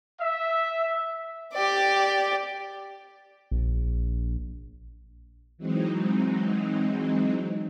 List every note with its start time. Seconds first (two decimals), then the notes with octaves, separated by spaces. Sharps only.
0.20 E5
1.53 G4 D5
3.51 A#1
5.58 E3 F#3 G#3 C4 D#4